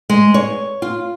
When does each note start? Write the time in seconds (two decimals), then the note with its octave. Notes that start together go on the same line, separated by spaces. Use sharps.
0.10 G#3
0.34 C#5
0.82 F4